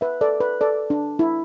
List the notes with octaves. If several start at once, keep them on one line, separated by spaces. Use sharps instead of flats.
B4 E5
A4 D5
B4
A4 D5
D4
E4